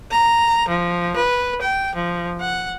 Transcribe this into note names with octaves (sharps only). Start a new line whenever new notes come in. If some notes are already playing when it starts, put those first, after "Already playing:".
A#5
F3
B4
G5
F3
F#5